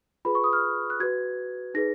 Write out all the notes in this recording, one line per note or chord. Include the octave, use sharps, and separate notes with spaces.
F4 G#4 B4 B5
C#6
D#6
F6
F#6
F#4 B4 G#6
D#4 G#4 B4 A#6